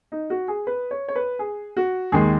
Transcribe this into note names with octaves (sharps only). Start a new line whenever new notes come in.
D#4
F#4
G#4
B4
C#5
C#5
B4
G#4
F#4
D#2 D#3 G#3 G#4